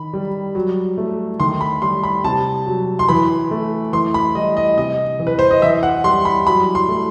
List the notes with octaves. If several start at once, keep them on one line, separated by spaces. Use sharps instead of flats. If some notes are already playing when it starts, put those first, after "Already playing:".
Already playing: D#3 B5
G3
F#3
A3
D#3 C6
B5
G3 C6
B5
C3 A5
F#3
C6
E3 B5
A3
E3 C6
B5
G3 D#5
D#5
C3 D#5
E3
B4
C5
D#5
E3 E5
F#5
G3 C6
B5
F#3 B5
C6
A3